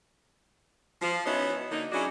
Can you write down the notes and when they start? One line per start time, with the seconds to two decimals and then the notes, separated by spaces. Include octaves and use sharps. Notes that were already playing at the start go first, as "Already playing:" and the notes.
1.02 F3
1.25 B3 C#4 D#4 E4 F#4 C#5
1.70 D3 A#3 D4 D#4
1.92 F#3 C#4 D4 E4 F#4 G#4